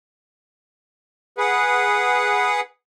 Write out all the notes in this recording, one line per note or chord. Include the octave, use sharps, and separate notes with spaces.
G#4 B4 F#5